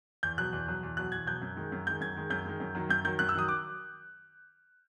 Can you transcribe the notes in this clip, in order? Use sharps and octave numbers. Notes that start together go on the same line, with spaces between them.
E2 G6
B2 F#3 F#6
E2
B2 F#3
E2
B2 F#3 F#6
E2 G#6
B2 F#3 G6
F#2
D#3 G#3
F#2
D#3 G#3 G6
F#2 G#6
D#3 G#3
F#2 G6
D#3 G#3
F#2
D#3 F#3
F#2 G6
D#3 F#3 G6
F#2 F#6
E6
D#3 F#3 D#6
D6